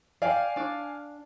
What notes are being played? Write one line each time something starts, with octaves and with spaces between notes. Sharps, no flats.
D5 F5 G5 G#5
D4 D5